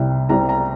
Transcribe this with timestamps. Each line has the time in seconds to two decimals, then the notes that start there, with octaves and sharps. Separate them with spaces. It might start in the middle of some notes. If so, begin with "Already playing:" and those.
Already playing: C2 C3 G3
0.29 C2 C3 G3 A#5
0.49 A#5